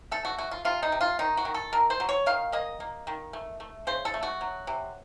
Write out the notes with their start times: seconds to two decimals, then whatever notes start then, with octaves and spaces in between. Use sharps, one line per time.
0.11 A3 A4
0.25 F#4
0.38 A3 F#4
0.51 F4
0.65 C3 F4
0.83 D#4
0.92 C3
1.01 F4
1.19 D#3 D#4
1.37 F#4
1.45 D#3
1.54 A4
1.73 D#3 A#4
1.90 C5
2.00 F#3
2.09 C#5
2.26 D#3 F5
2.52 A#3 D#5
2.80 A#3
3.07 D#3
3.33 A3
3.60 A3
3.87 C#3 C5
4.05 A4
4.14 A3
4.23 F#4
4.41 F#3
4.67 C3